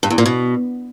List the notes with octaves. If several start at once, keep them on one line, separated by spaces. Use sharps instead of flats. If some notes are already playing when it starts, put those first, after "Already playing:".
G2
E2
A#2
B2